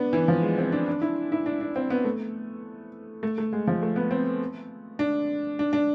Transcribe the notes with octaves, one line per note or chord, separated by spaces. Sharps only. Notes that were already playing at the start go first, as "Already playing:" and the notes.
Already playing: B3 D4
E3
F3
G#3
C4
D4
D4
E4
E4
D4
D4
C4
B3
A3
A3
A3
G#3
F3
A3
B3
C4
D4
D4
D4